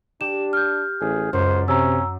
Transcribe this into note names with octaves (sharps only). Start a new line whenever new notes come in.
D4 G4 E7
F6 G6
A1 G#4
C#2 F#2 C5
C3 C#4 A#5 E6